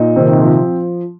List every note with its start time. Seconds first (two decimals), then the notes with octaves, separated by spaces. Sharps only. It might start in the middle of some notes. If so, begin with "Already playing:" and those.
Already playing: A#2 D#4
0.16 C3 D#3 C4
0.41 F3